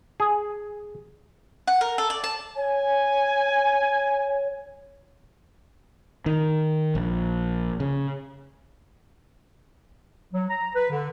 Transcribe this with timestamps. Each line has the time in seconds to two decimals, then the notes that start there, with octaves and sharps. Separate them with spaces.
0.20 G#4
1.67 F#5
1.81 A#4
1.98 A4
2.10 D5
2.24 A5
2.56 C#5 G#5
6.26 D#3
6.95 A#1
7.80 C#3
10.33 F#3
10.49 A#5
10.74 B4
10.90 D3